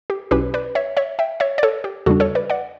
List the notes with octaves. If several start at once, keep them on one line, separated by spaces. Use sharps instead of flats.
G4
B1 B2 F#3 C#4 E4 G4 B4
B4 D5
C#5 E5
C#5 E5
E5 G5
C#5 E5
D5
A4 C#5
G4
E2 C#3 G3 D4 F#4 A4
A4 C#5
B4 D5
D5 F#5